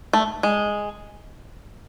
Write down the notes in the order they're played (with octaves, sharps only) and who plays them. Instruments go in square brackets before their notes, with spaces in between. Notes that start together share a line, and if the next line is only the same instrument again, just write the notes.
[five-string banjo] A3
G#3